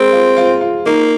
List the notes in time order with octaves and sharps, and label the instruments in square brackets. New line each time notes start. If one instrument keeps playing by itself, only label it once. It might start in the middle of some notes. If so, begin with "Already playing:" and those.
Already playing: [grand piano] G#3 A#4 [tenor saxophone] C4
[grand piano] F4
F4
F4
[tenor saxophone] A#3 [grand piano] D#4